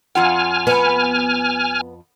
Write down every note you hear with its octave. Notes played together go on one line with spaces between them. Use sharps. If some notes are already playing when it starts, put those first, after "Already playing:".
F2 F4 F#5 G#5 F6
B3